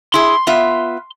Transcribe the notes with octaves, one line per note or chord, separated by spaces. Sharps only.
E4 G#4 C6
B3 F4 E5